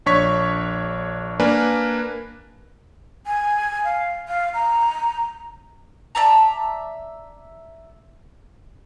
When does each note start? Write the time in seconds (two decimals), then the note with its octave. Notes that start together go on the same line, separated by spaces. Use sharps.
0.06 A#1 D4 C#5 C#6 B6
1.40 A#3 D4 A#4 B4 G#5
3.27 G#5
3.84 F5
4.28 F5
4.54 A#5
6.15 D5 E5 A5 A#5